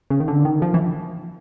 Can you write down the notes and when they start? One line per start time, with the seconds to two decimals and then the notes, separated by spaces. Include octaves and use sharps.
0.10 C#3
0.20 D#3
0.28 D3
0.45 D#3
0.62 F3
0.74 E3